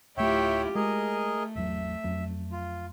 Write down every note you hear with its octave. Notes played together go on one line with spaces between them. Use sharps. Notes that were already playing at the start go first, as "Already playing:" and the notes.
D1 A3 E4 F4 G4 C#5 E5 G5
G#3 A3 G#4 A#4 D#5
G#1 E2 F#3 E5
F2 F#3
F4